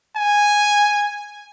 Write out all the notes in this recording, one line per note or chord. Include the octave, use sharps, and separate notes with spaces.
G#5